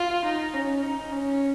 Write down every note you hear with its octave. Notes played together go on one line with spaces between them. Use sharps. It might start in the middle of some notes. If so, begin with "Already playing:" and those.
Already playing: F4
D#4
C#4
D#4
C#4